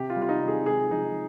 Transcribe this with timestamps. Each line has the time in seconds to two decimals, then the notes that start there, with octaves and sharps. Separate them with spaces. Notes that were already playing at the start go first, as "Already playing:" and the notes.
Already playing: C3 G4
0.10 F4
0.16 G3
0.22 F4
0.29 D#4
0.42 C3
0.48 G#4
0.66 G#3 G#4
0.91 F3 D#4